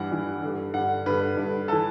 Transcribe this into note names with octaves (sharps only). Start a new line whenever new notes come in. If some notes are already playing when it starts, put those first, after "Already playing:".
Already playing: G2 E3 F#5
G2 E3
G2 D3
G2 D3 F#5
G2 D3 B4
G2 D3
E3 A4